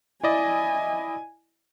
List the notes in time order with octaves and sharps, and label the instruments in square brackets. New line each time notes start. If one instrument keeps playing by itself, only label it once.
[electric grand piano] E4 D5 D#5 [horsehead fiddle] G#5